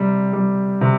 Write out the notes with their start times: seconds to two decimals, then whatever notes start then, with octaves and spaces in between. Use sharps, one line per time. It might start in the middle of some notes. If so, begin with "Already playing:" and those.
Already playing: C3 G3
0.33 G3
0.81 C3